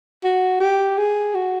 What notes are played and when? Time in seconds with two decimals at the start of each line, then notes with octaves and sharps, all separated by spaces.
0.24 F#4
0.60 G4
0.98 G#4
1.35 F#4